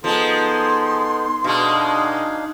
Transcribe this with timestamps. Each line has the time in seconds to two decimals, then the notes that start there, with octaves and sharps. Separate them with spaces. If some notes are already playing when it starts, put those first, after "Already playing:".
0.04 F3 G#3 B3 D#4 A4 C6
1.44 B2 G#3 D4 D#4 F5